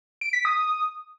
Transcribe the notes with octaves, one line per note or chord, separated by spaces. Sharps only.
D7
B6
D#6